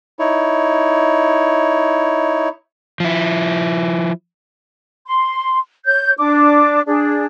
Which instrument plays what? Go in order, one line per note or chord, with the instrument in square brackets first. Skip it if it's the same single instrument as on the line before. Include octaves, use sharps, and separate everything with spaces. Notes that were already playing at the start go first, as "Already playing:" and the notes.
[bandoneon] D#4 E4 C#5
[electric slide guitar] F3 E4
[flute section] C6
C#5 G6
D4 D6
D4 G#4